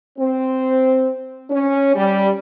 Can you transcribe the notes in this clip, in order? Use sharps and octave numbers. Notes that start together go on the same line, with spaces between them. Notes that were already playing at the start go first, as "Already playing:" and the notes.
C4
C#4
G3